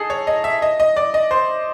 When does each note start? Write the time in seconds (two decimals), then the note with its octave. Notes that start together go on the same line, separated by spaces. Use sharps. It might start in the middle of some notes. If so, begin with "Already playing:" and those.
Already playing: D#4 G#4 A4
0.10 C#5
0.27 D#5
0.44 E5
0.62 D#5
0.80 D#5
0.97 D5
1.14 D#5
1.31 C5